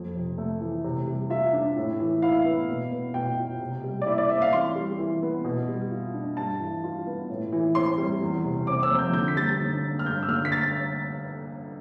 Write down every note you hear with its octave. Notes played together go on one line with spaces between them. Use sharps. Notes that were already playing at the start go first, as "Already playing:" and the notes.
Already playing: F2
C3
A3
E3
C3
G3
F4 E5
D4
A2
E3
E4 F5
B3
B2
B3
B2 G5
F4
C3
G3
D5
E4 E5
D5
C4 E5
F5
E3 C6
G3
E3
B3
B2
G3
F4
D4
G2 A5
E3
F4
B3
A2
E3
C4 C6
G3
E2
C3
C4 D6
E6
F3
G6
D3 G6
B6
G3 A6
D3
D4
F6
G2 G6
E6
D3 F6
B6
A6